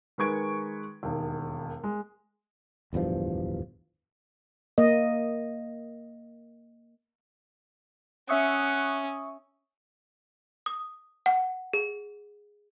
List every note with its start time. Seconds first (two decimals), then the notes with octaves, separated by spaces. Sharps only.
0.18 D#3 G#3 B4 C#6 G#6 D7
1.03 E1 D#2
1.84 G#3
2.93 D1 E2 G2 F3
4.78 A#3 D#5
8.29 C#4 E5 F#5 C#6 D#6
10.66 D#6
11.26 F#5
11.73 G#4